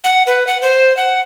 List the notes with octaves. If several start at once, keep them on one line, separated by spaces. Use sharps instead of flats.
F#5
B4
F#5
C5
F#5